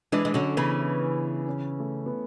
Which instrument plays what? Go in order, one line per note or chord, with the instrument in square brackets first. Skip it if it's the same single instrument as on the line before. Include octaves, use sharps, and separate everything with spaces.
[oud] E3 G#3 [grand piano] D4
[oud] G#3
[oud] D3 F#3 [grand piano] C#4
[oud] C#3 E3 [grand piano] B3
[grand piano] E4
C#4
A3
B3